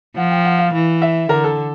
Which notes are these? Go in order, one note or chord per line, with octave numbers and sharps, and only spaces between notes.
F3 F#5
G5
F#5
F5
E3
E5
D3 A#4
A4